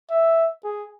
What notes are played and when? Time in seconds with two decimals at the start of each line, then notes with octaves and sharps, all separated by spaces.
0.10 E5
0.64 G#4